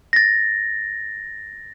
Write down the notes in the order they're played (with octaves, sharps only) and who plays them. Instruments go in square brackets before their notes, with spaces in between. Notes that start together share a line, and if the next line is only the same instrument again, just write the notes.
[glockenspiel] A6 A#6